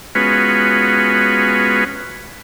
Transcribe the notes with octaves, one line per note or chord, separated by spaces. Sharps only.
G#3 B3 C#4 F4 F#4 B4